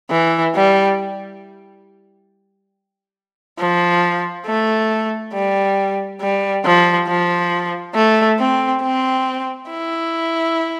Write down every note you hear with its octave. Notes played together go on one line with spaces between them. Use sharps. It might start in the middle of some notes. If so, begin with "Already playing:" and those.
E3
G3
F3
A3
G3
G3
F3
F3
A3
C4
C4
E4